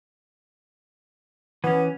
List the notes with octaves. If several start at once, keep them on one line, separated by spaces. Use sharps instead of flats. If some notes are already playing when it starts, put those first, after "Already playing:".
E3 B3 C#4